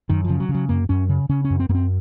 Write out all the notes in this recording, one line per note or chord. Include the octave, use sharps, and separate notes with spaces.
F#2 D#3
C#3 F3
F#3
C#3
F#3
F#2 A#3
F#2 C#4
C#3
C#3 C#4
C#4
F#2
C4
F#2 A#3
C4